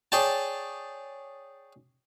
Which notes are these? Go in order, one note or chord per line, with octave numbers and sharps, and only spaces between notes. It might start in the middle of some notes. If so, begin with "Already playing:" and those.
G#4 C#5 D5 G5 A5